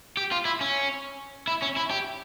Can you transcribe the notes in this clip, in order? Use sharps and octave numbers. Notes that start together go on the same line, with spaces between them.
G4
F4
E4
C#4
E4
C#4
E4
G4